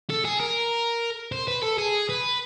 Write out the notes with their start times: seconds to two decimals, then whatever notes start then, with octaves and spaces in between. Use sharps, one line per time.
0.10 A4
0.25 G#4
0.40 A#4
1.32 C5
1.48 B4
1.63 A4
1.78 G#4
2.09 B4